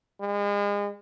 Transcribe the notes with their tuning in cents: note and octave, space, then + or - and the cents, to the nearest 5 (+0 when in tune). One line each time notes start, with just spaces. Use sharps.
G#3 -35